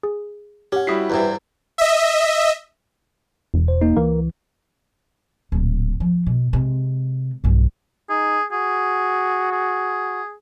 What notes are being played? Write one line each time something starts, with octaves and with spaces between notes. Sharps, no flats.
G#4
C#4 G4 F#5
G3 E4 F#4 D#6 B6 C7
E2 G2 C3
D#5 E5
E1
C5
A#3 D#4
C#2 E3 A#3
D1 A#2
F3
B2
C3 G#3
B1 G2
D#4 G#4
F#4 G#4
G#4